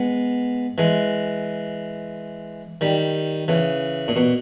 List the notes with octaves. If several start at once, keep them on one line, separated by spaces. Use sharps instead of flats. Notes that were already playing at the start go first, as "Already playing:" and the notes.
Already playing: G#3 B3
E3 G#3
D#3 G3
C#3 E3
A#2
B2